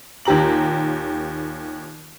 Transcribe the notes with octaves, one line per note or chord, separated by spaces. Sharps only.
D#2 A#2 G4 A#5 F#7